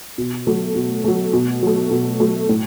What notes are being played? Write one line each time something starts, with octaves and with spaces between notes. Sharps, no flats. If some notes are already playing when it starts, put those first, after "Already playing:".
B2
F#3 A3
B2
F#3 A3
B2
F#3 A3
B2
F#3 A3
A2